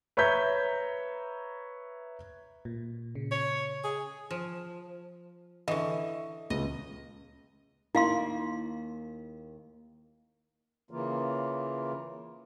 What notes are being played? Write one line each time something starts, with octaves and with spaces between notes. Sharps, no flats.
B4 C#5 E5 A#5 G6 B6
A#2
C#3
C#5
G#4
F3
D3 E3 D#5 E5 C#6
C#2 D#5
D#2 A#3 E4 F5 C6
C#3 E3 A#3 F4